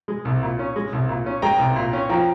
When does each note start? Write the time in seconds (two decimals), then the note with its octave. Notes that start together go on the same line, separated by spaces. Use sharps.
0.08 G#3
0.25 C2
0.42 A#2
0.59 C#4
0.76 G#3
0.93 C2
1.09 A#2
1.26 C#4
1.42 G#3 G5 A#5
1.59 C2
1.76 A#2
1.93 C#4
2.09 F3 G5 A#5